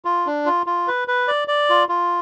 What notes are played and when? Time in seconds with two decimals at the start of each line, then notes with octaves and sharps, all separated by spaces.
0.05 F4
0.26 D4
0.46 F4
0.66 F4
0.88 B4
1.08 B4
1.28 D5
1.48 D5
1.70 F4
1.89 F4